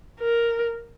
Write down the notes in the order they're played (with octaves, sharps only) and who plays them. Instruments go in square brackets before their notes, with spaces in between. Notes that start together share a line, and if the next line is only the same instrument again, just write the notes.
[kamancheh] A#4